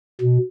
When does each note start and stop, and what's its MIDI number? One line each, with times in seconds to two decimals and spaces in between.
0.21 0.38 47